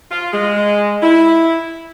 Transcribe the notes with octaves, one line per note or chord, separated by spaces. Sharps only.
F4
G#3
E4